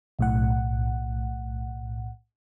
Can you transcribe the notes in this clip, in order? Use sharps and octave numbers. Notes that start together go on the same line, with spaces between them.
B1 A2 F#5